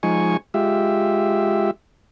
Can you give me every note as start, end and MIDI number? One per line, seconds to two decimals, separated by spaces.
0.03 0.37 53
0.03 0.37 56
0.03 0.37 63
0.03 0.37 80
0.03 0.37 85
0.54 1.71 56
0.54 1.71 65
0.54 1.71 67
0.54 1.71 76